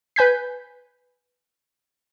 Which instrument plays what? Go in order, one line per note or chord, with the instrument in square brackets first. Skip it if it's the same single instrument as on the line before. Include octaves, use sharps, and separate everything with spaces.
[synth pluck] B4 G#5 G6 B6